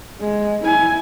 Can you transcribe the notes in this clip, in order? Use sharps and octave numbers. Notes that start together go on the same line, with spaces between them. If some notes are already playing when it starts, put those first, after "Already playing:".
G#3
E4 G#5